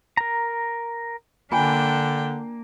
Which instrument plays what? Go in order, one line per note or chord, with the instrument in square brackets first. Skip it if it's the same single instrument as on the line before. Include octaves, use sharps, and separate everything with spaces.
[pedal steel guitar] A#4 A#5
[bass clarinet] D3 [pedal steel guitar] A#3 [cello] D4 G5 [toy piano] F4 G#5